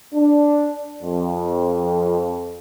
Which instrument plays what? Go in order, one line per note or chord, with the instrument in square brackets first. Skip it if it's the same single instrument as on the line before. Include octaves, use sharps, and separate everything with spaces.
[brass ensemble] D4
F2